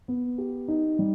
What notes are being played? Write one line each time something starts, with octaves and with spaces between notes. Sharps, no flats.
B3
G4
D#4
G3